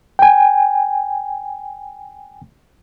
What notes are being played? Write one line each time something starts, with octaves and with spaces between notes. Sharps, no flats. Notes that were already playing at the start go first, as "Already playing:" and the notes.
G5 G#5